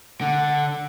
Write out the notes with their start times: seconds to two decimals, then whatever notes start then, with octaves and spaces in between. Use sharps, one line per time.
0.21 D3 F#5